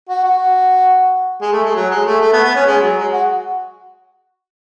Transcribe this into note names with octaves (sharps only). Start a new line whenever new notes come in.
F#4
F#4
G#3
A3
G#3
F#3
G#3
A3
A3
B3
B3
C#4
G#3
F#3
G#3
F#4